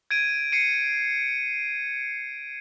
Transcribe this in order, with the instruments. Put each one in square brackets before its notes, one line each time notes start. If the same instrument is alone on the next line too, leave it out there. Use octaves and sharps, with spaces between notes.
[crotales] G#6 D7 D#7
C7 C#7 D#7